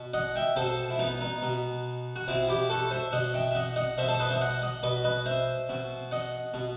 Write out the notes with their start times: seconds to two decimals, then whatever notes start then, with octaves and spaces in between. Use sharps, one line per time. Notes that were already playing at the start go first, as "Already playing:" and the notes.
Already playing: B2
0.14 D#5 F#5
0.35 E5 G5
0.56 B2 A4 C5
0.90 E4
0.99 B3 D#4
1.21 B3 D#4
1.42 B2
2.16 F#4
2.28 B2 C4 E4
2.48 E4 G4
2.70 F#4 A4
2.91 C5 E5
3.12 B2 D#5 F#5
3.34 E5 G5
3.51 E5
3.55 D#5 F#5
3.76 D#5 F#5
3.98 B2 C5 E5
4.08 A4 C5
4.20 B4 D#5
4.30 C5 E5
4.41 D#5 F#5
4.62 D#5 F#5
4.83 B2 B4 D#5
5.04 B4 D#5
5.26 C5 E5
5.69 B2
6.11 D#5 F#5
6.54 B2